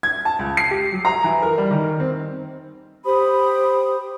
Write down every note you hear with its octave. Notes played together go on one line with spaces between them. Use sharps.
G#6
A5
C#2
C7
G4
F#3
A#5
E3
A#4
G3
D#3
C4
G4 C5 B5 D#6